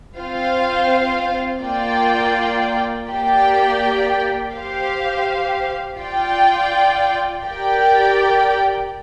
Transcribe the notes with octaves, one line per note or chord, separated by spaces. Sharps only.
C4 F4 C5 F5
A#3 F4 D5 G5
A#3 G4 D5 G5
G4 C5 F5
F4 D5 G5
G4 A#4 D5 G5